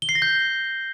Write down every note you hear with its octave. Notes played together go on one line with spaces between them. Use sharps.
G7
C7
A#6
G6